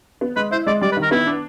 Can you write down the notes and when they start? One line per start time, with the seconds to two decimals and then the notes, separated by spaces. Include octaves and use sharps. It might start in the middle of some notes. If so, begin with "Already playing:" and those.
0.21 B3
0.36 G#3 B4
0.51 E4 C5
0.67 G#3 D5
0.82 G3 D5
0.92 B4
0.97 D#3
1.02 A#4
1.11 B3 E4
1.27 D4